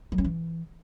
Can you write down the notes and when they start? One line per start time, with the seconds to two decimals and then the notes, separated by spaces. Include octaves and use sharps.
0.12 F#3
0.18 C#4
0.24 E3